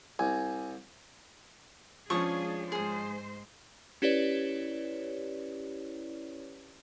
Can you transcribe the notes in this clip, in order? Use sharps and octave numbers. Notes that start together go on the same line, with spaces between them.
C2 G#5
F3 G#3 C#4 D4 G#4 C#6 D#6
G#2 G#3 G#4 C5 D#6
C#4 E4 G4 B4 C#5 D5